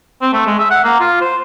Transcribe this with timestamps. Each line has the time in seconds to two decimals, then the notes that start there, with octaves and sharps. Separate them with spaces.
0.22 C4
0.33 A3
0.47 G#3
0.59 E5
0.71 F#5
0.84 A#3
1.00 F4
1.21 C5